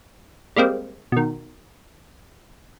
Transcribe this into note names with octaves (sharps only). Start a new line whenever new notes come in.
G3 G#3 A#3 C4
B2 D#3